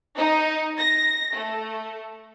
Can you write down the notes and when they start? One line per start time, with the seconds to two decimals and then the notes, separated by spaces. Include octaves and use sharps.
0.16 D#4
0.79 A#6
1.33 A3